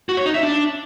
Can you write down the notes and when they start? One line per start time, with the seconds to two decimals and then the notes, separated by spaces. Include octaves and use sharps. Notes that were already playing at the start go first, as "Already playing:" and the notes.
0.09 F#4
0.17 C#5
0.26 D#4
0.34 E5
0.43 D4